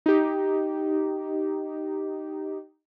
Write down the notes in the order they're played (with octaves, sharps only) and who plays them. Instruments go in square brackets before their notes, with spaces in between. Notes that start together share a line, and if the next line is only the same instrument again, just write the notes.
[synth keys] D#4 G4